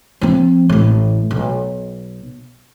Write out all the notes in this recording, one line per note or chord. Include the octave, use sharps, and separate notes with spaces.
F3 C4
A1 A2
B1